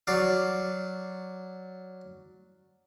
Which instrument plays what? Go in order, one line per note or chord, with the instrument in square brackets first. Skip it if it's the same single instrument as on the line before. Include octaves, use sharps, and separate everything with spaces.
[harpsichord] F#3 D5 F5